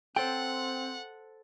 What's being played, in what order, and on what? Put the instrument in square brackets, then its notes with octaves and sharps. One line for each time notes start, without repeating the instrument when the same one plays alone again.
[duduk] C4 [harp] A4 C5 [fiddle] F#5 [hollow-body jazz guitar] G5